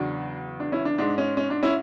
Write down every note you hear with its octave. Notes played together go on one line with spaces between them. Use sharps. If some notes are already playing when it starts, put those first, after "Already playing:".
Already playing: E2 C#3 F#3 D4 F#4
D4
C#4 E4
D4
G#2 G#3 D4
C#4
C#4
D4
C#4 E4